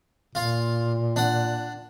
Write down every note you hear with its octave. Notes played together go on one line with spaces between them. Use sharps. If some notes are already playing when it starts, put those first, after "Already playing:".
A#2 F4 F5
D4 F#5